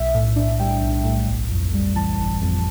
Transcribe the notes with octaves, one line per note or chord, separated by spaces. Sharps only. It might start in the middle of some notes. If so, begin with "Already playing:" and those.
Already playing: B1 E5
A2
D4
G3 G5
B1
A2
G1
F2
G3
E3 A5
G1
F2